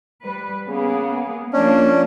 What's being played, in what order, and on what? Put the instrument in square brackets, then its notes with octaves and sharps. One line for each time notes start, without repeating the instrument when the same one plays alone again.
[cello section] G3 B4
[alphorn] C#3 [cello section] A#3 B3 G#4
[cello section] F3 A#3 [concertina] C#4 [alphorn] D4